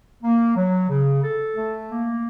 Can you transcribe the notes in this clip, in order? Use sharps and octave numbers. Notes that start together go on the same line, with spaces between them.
A#3
F#3
C#3
A4
A3
A#3